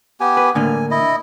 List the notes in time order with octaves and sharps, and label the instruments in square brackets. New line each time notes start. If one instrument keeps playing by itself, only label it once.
[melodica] B3 G4 G#5
[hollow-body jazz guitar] B4
[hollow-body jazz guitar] A2 D3 A#3 [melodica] G#5
[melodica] E4 D#5